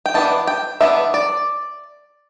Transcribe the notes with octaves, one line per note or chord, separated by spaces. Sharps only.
G5
E3 B3 D4 A5
G5
E3 B3 D4 E5
D5